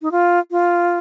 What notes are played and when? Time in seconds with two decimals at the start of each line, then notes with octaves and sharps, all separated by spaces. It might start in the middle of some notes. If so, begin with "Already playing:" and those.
0.02 D#4
0.11 F4
0.51 F4